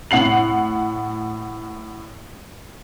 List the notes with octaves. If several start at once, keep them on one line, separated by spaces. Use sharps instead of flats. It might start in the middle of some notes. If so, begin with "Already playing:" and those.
A2 F#5 C7 F#7